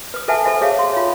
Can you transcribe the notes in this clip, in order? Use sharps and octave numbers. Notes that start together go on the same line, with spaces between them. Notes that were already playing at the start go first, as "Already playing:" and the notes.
B4 D#6
A4 B4 E5 F#5 G#5 A5
A4 C5 E5
G#4 C#5 E5 F5
C6
F4 C#5